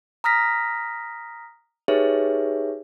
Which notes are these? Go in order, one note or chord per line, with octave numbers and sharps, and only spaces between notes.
A#5 D#6 F6 A#6 B6
D#4 G4 G#4 B4 C#5 E5